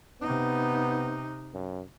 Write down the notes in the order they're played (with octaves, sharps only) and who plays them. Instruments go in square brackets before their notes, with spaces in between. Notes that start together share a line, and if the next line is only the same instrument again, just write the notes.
[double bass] C3 D#4 [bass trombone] B3
[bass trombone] F#2